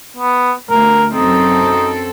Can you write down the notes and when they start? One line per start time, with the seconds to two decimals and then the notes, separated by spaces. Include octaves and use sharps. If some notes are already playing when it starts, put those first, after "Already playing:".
0.17 B3
0.70 D2 A#4
1.12 F#2 C4 D#4 A4